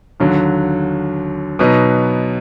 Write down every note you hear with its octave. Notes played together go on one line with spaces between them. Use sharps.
D#2 D3 F#3
B2 F#3 B3 D#4